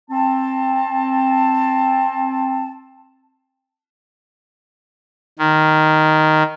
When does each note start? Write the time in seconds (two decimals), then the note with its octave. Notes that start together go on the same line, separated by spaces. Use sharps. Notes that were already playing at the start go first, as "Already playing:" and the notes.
0.10 C4 A5
5.39 D#3